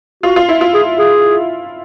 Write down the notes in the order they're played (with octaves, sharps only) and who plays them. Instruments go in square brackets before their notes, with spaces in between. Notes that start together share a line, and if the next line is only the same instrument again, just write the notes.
[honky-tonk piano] F4 [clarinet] F#4
[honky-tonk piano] F4
E4
F4
[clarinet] G#4
G#4